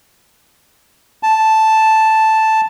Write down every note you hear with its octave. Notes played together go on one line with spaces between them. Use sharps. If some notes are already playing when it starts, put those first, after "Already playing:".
A5